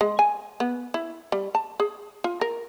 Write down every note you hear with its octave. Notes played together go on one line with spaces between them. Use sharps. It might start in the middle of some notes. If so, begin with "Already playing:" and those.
G#3
G#5
B3
E4
G3
A5
G#4
F4
A#4